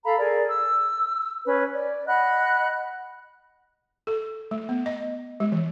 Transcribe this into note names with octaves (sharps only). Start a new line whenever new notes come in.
A4 F5 A#5 B5
G#4 A#4 D5
E6
C#4 B4
D5
D#5 F#5 B5 F#6
A4
A3
B3
D#5
G#3
E3